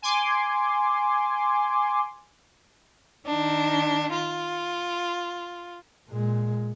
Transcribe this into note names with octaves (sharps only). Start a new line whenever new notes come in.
G#5 C6 D6
D#3 D4
F4
A#2 G#3